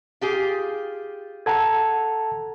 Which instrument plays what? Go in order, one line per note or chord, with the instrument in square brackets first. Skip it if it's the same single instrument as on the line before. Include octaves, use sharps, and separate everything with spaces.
[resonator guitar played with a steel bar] F4 G4 G#4
[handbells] A4 F#5 A#5 [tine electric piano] A5 G#6